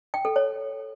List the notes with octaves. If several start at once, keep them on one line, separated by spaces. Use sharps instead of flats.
G5
A4
C#5